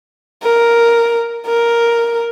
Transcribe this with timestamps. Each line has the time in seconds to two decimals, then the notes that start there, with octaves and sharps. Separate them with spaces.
0.43 A#4
1.47 A#4